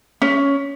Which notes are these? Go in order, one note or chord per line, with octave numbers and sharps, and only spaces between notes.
C#4